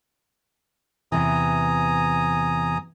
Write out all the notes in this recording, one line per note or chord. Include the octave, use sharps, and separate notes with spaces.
E2 C3 E3 G#5 A#5 D#6